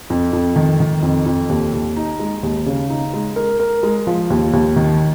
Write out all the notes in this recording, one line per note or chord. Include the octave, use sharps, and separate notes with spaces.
F2
F2
D#3
D#3
F2
F2
D#2
D#2
D#4
G#3
D#2
C#3
D#4
G#3
A#4
A#4
G#3
F3
D#2
D#2
D#3